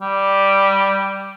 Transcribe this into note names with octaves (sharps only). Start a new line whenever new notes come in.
G3